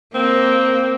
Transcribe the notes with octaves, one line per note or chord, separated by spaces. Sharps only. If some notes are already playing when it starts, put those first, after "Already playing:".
A#3 C4